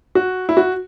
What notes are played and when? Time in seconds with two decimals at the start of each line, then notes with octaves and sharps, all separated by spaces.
0.15 F#4
0.49 E4
0.57 F#4